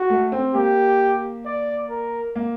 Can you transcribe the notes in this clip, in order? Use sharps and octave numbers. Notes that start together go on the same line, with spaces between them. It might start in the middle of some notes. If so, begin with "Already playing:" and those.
Already playing: F#4
A3
C4
A#3 G4
D5
A#4
A#3